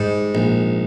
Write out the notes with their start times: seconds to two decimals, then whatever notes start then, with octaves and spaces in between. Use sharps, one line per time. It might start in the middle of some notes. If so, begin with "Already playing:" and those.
Already playing: G#2 G3
0.35 A#1